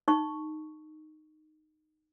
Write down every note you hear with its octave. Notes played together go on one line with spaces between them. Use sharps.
D#4 C#6